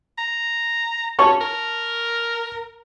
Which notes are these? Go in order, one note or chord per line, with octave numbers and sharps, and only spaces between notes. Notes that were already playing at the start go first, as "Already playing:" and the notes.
A#5
C#4 C#5 A5 C#6
A#4